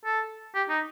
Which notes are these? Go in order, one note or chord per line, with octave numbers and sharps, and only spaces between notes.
A4
G4
D#4